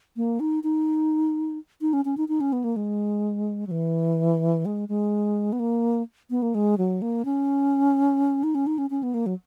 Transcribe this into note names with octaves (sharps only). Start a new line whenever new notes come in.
A#3
D#4
D#4
D#4
C#4
C#4
D#4
D#4
C#4
B3
A#3
G#3
F#3
E3
G#3
G#3
B3
A#3
B3
A#3
G#3
F#3
A#3
C#4
D#4
C#4
D#4
C#4
C#4
B3
A#3
F#3